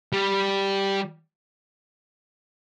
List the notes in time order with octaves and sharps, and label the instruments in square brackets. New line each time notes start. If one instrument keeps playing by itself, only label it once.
[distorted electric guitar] G3